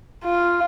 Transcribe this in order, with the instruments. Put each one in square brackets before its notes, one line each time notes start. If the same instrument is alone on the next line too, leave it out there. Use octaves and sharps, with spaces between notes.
[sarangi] F4